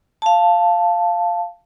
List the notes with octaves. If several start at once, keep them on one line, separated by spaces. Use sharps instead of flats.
F5 A5